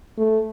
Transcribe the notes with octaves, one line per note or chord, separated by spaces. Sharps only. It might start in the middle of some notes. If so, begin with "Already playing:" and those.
A3